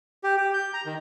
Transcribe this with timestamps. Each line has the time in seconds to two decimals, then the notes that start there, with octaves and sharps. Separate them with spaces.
0.24 G4
0.37 G4
0.54 G6
0.74 A#5
0.86 D#3